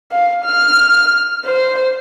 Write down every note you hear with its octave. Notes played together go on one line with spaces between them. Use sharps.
F5
F6
C5